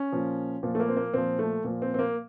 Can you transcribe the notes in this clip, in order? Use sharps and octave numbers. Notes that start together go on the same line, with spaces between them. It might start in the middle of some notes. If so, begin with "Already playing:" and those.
Already playing: C#4
A#2 F3
A#2 F3
A3
A#3
C4
A#3
A#2 F3 C4
A3
A#2 F3
C4
C4
A#3